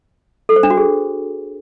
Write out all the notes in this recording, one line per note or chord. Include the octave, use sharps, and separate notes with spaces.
A4
C5
D4
F#4
G#4